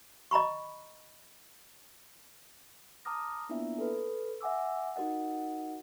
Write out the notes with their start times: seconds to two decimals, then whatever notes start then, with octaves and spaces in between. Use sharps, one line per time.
0.31 D#5 A#5 B5 C#6
3.05 A5 A#5 D6 D#6 F6 A#6
3.49 A#3 B3 D4 E4 F4 E5
3.78 A4 B4
4.41 E5 F#5 G#5 D6 E6
4.96 D#4 F#4 A#4 D#5 F#5